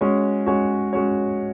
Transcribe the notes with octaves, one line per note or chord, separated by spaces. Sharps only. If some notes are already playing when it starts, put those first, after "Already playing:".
G#3 C#4 F#4 C#5
G#3 C#4 F#4 C#5
G#3 C#4 F#4 C#5